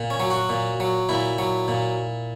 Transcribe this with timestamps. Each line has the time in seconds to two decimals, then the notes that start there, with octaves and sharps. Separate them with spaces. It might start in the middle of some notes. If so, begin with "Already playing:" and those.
Already playing: A#2
0.10 C#4
0.20 F#3
0.30 F#4
0.49 A#2
0.80 F#3
1.09 A#2 E4
1.38 F#3
1.68 A#2